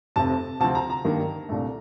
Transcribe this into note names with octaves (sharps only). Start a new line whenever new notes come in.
F1 F2 C3 A5
D2 C3 F3 C4 A5
A#5
A#5
G2 D#3 A#3 D4
C2 A#2 A3 D4